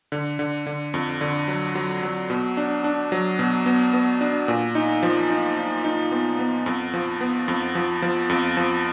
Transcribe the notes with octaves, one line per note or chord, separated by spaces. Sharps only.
D3
D3
D3
F2
D3
F#3
F#3
F#3
B2
D4
D4
F#3
B2
B3
B3
D4
A#2
D#4
F3
D#4
D#4
D#4
B3
B3
F2
F3
B3
F2
F3
F3
F2
F3